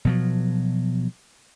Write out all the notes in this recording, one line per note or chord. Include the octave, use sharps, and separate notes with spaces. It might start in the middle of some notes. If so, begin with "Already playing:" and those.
B2 F3 F#3